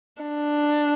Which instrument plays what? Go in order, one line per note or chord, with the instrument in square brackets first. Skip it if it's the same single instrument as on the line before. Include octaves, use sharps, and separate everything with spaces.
[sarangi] D4